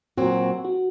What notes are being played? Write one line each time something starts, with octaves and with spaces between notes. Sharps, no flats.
A#2 F#3 C4 F#4
F#4